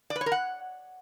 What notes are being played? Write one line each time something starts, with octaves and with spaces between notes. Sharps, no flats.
D5
B4
C#5
A#4
F#5